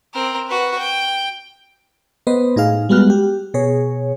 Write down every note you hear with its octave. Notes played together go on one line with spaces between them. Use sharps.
C4 A#4
F#4 B4
G5
B3 B4 C5 D#5
A2 D#4 G#4 F5
G3 G#3 B3 F#4 F6 F#6
G4
B2 G#4 C#5